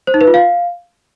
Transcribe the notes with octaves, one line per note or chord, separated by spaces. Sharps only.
C5
D#4
B4
F4
F5